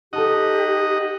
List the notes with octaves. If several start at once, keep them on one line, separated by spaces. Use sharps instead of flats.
D#4 G4 A4 D#5 F#5 A5 D#6